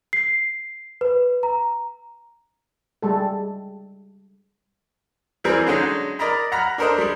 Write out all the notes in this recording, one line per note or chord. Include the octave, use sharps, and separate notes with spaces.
C7
B4
A#5
G3 G#3 A4
E3 G3 C4 G#4 A#4
D3 F#3 G#3 C#4 D#4
A#4 D5 D#5 A#5 B5
F#5 A#5 B5 F6
D4 A4 A#4 C5 D#5
G3 G#3